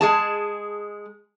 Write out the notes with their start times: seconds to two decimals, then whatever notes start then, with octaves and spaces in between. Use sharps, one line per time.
0.01 G#3 G#4 A5